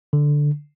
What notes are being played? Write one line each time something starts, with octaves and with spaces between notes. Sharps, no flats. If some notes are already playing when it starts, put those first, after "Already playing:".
D3